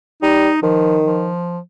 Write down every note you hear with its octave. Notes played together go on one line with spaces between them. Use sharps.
G3 D#4
D#3 F3
F3